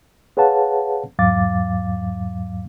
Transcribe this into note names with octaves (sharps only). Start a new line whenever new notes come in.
G#4 B4 C#5 F5 F#5 A5
E2 G#2 F#3 F5 D6 A6